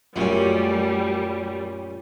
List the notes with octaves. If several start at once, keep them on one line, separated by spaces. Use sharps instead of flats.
F#2 A#2 G3 A3 C#4 F#4